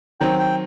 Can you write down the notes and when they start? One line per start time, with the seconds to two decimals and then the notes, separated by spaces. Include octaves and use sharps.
0.20 D#3 F#3 C4 G5
0.39 G5